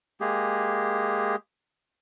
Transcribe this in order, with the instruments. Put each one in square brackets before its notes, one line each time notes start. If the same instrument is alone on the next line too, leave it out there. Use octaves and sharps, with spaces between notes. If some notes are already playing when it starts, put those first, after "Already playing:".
[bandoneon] G#3 A#3 G4 G#4